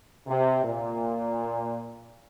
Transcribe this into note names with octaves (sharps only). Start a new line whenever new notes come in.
C3
A#2